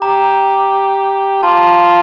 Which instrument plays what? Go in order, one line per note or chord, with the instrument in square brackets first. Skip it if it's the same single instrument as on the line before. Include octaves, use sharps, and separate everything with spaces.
[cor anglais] G4 [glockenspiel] A#5
[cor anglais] F4 [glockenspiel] A5
[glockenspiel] A5